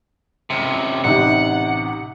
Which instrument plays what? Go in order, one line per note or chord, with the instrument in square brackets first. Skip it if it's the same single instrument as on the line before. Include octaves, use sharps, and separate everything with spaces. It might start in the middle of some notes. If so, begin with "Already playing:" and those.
[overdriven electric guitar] C#2 C3
[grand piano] A1 C3 D#4 [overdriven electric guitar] F#5